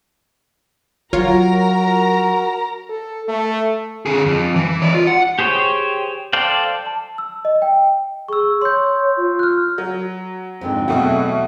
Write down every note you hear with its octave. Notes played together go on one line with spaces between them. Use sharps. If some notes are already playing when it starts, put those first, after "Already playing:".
F#3 F4 F#4 A#4 C#5 A#5
A4
A3
D3 G#4
F2
E3
C#5 D5
F4
F#5
G4 G#4 C5 C#5 G5
A4 C5 D5 F5 G5
A5
E6
D#5
G5
G#4 C#6 E6
C#5 C6 G6
F4
F6 F#6
F#3
F2 G#2 D3 C4
E2 B2 F#3 A3 E4 F#4